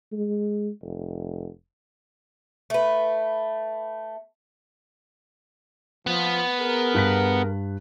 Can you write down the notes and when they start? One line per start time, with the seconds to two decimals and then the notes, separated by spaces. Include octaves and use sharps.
0.13 G#3
0.82 F1
2.70 A3 B4
6.07 F3 B3
6.59 G#4 A#4
6.94 G2 F#6 B6